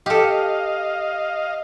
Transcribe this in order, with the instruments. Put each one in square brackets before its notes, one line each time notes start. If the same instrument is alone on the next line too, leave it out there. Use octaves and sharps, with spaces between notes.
[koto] G4 A4 [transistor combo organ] D#5 F5